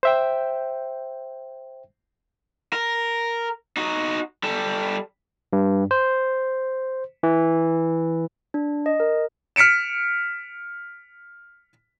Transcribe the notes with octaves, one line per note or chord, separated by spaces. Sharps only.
C5 E5 G5
A#4
D#4 F#4
G3 A4
G2
C5
E3
D4
D#5
A#4
F6 B6 C#7 D7 E7